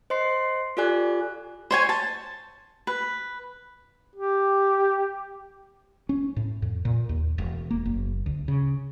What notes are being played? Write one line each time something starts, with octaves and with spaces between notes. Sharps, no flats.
C5 D#5 C6 C7
F4 G4 A4 D5 G#5 F#6
C5 C#5 G#5
A5
B4
G4
C#4
A2
F2
A#2
D#2
E1
A#3
F#1
D2
C#3